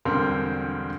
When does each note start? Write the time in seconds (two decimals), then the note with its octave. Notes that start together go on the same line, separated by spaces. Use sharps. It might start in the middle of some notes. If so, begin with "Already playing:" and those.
0.05 E1 D3 G3 C4 A#4 C6